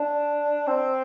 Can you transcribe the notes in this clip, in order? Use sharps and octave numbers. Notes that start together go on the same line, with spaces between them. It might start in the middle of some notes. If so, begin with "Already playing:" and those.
Already playing: D4
C4